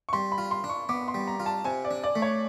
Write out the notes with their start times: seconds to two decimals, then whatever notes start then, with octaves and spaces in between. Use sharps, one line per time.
0.09 C#6
0.13 G3 C6
0.32 B5
0.38 F4
0.51 C6
0.64 D4
0.69 C#6
0.89 B3 D6
1.08 C6
1.14 G3
1.28 A#5
1.40 F4
1.46 A5
1.65 C3 G#5
1.85 D5
1.91 D4
2.04 D5
2.15 A3
2.22 C#5